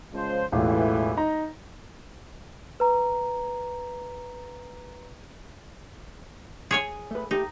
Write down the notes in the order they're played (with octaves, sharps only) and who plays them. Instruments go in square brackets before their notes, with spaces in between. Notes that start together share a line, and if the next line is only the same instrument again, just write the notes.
[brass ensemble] C#2 F3 C5
[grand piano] E1 A1 F4 [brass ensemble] A2 E3
[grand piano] D#4 A#5
[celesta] B4 A#5
[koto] G#4 C#5 G#5
[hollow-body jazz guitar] A3 B4
[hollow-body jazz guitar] A3 G4 [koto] D#4